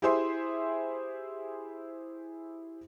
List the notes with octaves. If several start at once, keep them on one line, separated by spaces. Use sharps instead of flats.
E4 G4 G#4 C5 E5 C6